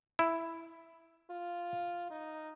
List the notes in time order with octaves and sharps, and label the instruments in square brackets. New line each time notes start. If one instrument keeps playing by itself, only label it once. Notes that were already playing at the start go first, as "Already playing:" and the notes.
[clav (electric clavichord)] E4
[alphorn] F4
D#4